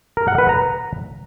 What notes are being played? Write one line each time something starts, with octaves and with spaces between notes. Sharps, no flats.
A#4
F#5
B4
A#5